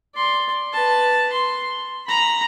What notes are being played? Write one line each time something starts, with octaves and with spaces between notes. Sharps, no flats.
D5 C6
B4 A5
C6
A#5 B5